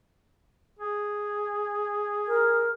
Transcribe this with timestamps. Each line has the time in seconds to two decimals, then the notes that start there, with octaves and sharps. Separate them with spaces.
0.79 G#4
2.28 A#4